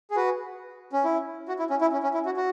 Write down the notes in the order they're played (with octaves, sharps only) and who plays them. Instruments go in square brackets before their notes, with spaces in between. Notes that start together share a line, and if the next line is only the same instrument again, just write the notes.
[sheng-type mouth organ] G#4
F#4 B4
C#4
E4
F#4
E4
C#4
E4
C#4
C#4
E4
F#4
F#4